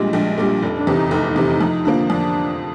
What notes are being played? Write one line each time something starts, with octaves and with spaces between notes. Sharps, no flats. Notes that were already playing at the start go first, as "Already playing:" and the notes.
Already playing: A#1 A#2 G3 G#3
A#1
A#2 G3
F1 D4
D4
E2 C3
D#4
F1 D#4
E2 C3
F2
D3 F3 A#3
F2 D4